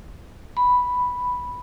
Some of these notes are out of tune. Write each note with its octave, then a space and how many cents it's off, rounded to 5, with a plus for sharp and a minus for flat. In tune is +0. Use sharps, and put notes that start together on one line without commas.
B5 +0